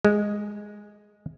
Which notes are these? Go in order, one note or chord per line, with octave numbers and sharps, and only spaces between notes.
G#3